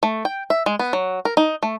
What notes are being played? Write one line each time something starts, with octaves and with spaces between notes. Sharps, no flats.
A3
G5
E5
G#3
B3
F#3
A#4
D#4
A3